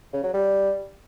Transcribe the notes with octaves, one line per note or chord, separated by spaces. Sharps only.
C#3
F#3
G3